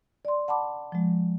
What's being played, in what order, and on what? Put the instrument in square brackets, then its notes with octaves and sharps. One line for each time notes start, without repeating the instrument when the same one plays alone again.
[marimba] D5 C6
F#5 A5 B5 D6
F3 G#3